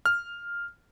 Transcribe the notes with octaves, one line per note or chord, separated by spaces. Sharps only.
F6